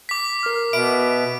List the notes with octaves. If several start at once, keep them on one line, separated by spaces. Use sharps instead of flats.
D6 B6
A#4 F6
B2 E5 B5 D6 D7